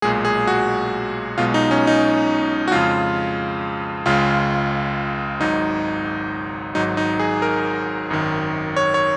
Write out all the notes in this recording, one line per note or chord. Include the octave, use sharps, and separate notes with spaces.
B1 A#2 G#3 G#4
G#4
F#4
B1 B2 G#3 F4
D#4
C#4
D#4
F#4
F2 C#3 G#3 F4
C#2 C#3 G#3 F4
G#1 G#2 F#3 D#4
G#1 G#2 F#3 D#4
D#4
G#4
A#4
G#1 F#2 D#3
C#5
C#5